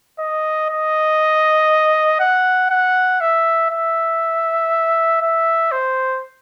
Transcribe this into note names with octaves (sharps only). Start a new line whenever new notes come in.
D#5
D#5
F#5
F#5
E5
E5
E5
C5